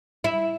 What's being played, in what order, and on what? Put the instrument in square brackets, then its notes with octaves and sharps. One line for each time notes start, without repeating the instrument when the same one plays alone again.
[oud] E4